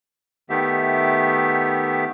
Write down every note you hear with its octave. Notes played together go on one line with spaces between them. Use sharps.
D#3 A3 B3 G4 E5